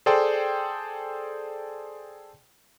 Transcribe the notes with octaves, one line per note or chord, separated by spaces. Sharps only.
G#4 A4 C5 D5 G5 C6